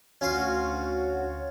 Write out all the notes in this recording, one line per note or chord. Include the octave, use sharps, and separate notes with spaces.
D2 C#4 F4 F#4 C#5 C6